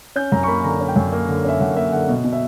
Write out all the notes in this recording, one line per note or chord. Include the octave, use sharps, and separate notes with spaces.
C#4 G6
F#2 A#5
C#6
A#3 B5
D3 A#5
C#4
G5
F#2
A#3
D3
C#4 E5
F#2 F#5
A#3 E5
D3 F#5
B2
B2
E5